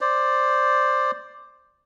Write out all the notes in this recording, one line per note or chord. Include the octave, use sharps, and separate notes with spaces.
C5 D5